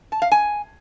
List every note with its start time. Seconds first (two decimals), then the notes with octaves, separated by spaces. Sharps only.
0.12 A5
0.22 F5
0.32 G#5